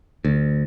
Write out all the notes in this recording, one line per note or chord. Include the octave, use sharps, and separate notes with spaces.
D2